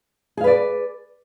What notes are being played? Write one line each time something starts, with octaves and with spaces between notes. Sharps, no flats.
G#4 B4 D5 F5